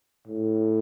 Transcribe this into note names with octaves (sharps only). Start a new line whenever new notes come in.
A2